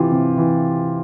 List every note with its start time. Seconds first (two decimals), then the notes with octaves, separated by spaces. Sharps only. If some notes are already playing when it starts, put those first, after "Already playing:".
Already playing: C3 E3 F4 G4
0.12 C3
0.37 E3